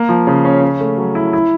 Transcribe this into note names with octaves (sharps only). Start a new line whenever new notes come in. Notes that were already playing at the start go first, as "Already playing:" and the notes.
Already playing: A#3
F3
C#3
C#4
C#4
A3
F#3
E4
E4